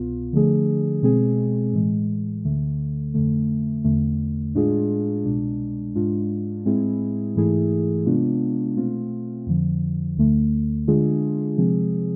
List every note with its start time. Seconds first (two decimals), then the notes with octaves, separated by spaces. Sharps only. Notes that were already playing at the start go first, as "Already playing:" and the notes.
Already playing: C2 B2 B3 F4
0.33 D3 F3 A3 D4 G#4
1.02 B2 G#3 C4 G#4
1.73 A2 E3 G#3
2.44 D2 D3 A3
3.14 F2 D3 A3
3.84 E2 D3 A3
4.54 A2 G#3 D4 F4 G#4
5.25 C2 B2 G#3 D4
5.95 G#2 G#3 D4 F4
6.66 A2 G#3 C4 E4 G#4
7.36 G#2 E3 A3 E4 G#4
8.06 C3 G#3 B3 D4 F4
8.77 B2 A3 C4 F4
9.46 F2 D3 F3
10.17 D2 D3 A3
10.87 D3 G#3 D4 F4 G#4
11.58 C3 F3 G#3 C4 G#4